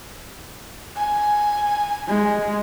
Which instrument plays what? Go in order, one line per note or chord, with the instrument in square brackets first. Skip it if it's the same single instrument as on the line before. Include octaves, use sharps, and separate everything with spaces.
[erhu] G#5
[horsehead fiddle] G#3